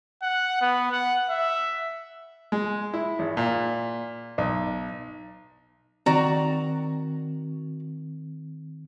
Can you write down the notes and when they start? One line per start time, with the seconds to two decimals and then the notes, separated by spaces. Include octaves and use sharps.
0.23 F#5
0.61 B3
0.92 F#5
1.29 E5
2.52 G#3
2.94 E4
3.19 G#1
3.37 A#2
4.38 B1
6.06 D#3 C4 F#4 D5 A#5